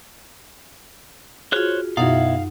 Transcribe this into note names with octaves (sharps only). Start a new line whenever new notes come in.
F4 F#4 G#4 C5 C#5 F#6
F#2 B2 D#4 E4 F#4 F5 F#5